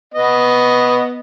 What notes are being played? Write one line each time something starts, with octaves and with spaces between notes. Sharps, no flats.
B3 D#5